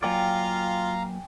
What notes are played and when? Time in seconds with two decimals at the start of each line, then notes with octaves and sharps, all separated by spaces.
0.03 F#3 A#3 F4 D5 F5 G5 G#5 A#5